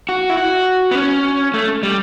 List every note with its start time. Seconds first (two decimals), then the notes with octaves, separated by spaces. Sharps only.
0.09 F#4
0.30 E4
0.37 F#4
0.91 B3
0.95 C#4
1.54 A3
1.83 G3